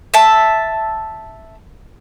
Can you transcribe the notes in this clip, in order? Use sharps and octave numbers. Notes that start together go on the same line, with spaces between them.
E5 A5